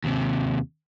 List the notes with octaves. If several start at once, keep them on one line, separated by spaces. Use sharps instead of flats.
D#2 C3